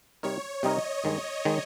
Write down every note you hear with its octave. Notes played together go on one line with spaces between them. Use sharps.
C3 G3 C4 D#4 A#4 C#5
C3 G3 C4 D#4 A#4 D#5
G2 D#3 G#3
D#3 G#3